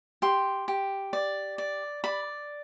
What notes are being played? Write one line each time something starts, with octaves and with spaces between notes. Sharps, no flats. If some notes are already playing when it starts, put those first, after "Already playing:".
G4 C6
G4
D5
D5
D5 B5